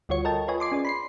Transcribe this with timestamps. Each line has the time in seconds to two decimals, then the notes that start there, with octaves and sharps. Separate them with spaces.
0.09 D2 G3 F4 F#4 C#5 C#7
0.25 A4 A#4 D#5 G5 A5
0.48 F4 B4 C#5 D#5 G#5
0.60 C6 D6 C7
0.72 C#4 G#4 D5
0.85 B5 C6 C7